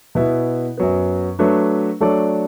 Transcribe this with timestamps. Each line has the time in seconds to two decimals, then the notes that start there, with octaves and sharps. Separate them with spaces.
0.15 B2 B3 E4
0.77 F#2 F#3 B3
1.39 F#3 A3 D4 B4
2.00 F#3 A3 D4 A4 D5